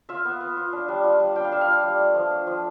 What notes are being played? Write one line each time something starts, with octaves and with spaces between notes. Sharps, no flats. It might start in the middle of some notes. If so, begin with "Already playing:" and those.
F4 E5
B3
B3
F4
D4
G3
F4
G3
D4 G5
F5
G3 E5
F5
F4
G3
A3
F3
D4
F3